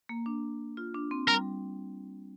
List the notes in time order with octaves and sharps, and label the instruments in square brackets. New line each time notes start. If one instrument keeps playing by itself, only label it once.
[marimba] A#3
D4
F4
D4
C4
[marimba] G3 [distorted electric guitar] A#4